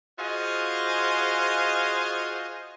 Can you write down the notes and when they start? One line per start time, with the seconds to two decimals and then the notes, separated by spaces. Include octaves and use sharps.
0.19 F4 F#4 G#4 C5 D#5